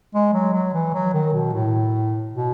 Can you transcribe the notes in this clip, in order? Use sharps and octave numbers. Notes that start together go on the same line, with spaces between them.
G#3
F#3
F#3
E3
F#3
D#3
B2
A2
B2